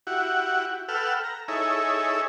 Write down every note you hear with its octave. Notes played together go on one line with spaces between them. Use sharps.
E4 F#4 G4 F#5
A4 B4 F#5 G5 E6 F6
A#5
D#4 E4 G#4 A4 C#5 E5